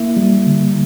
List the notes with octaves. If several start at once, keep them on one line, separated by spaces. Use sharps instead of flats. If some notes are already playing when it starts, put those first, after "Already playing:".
Already playing: A#3 E4
G3
D3